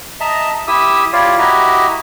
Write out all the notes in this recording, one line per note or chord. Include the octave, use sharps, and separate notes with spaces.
D#5 E5 A5 A#5
E4 G4 E5 D#6 E6
E4 F4 G4 C#5 D5 F5
E4 F#4 G4 D#5 E5 A#5